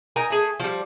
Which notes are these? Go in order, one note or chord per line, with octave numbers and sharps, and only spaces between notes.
D#4 A#4 G#5
A3 G#4
F3 G3